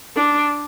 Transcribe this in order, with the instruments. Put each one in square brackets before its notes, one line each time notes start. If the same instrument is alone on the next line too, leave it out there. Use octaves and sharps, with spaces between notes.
[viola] D4